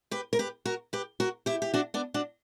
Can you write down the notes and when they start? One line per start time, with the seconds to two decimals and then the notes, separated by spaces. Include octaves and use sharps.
0.11 G4 B4
0.33 A#4
0.39 G4 B4
0.65 F#4 A#4
0.93 G4 B4
1.20 F#4 A#4
1.46 E4 G4
1.62 G4
1.74 D4 F#4
1.94 B3 D4
2.14 D4 F#4